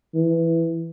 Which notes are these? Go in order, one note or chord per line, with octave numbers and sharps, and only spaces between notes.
E3